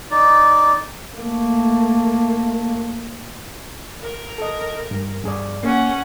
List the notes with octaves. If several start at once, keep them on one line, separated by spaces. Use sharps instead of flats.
D#4 D5
A3 A#3
A#4
A4 D#5
G2
G2 G#4 D5
A#3 C#4 F#5